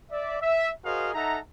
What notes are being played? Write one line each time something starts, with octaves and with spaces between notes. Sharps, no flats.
D5 E5
E5
F#4 G#4 A#4 C5 D#5 F5
D#4 A4 E5 F#5 A#5